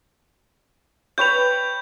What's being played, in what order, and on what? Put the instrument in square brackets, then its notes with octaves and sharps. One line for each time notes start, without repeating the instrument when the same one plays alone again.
[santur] B4 C#5 G5 [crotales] G6 F7